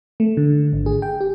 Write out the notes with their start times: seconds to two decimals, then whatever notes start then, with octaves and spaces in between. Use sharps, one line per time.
0.20 A3
0.37 D3
0.73 G#1
0.86 G#4
1.02 G5
1.21 G4